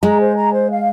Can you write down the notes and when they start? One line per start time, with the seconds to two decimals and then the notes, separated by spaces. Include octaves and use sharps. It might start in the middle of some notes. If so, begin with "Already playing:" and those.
0.03 G#3 A#5
0.20 C5
0.36 A#5
0.53 C5
0.69 F5